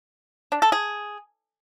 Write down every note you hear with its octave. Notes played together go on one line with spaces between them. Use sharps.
D4
A4
G#4